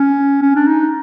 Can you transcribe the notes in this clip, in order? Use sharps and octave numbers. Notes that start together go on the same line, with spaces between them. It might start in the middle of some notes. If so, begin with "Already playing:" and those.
Already playing: C#4
C#4
D4
D#4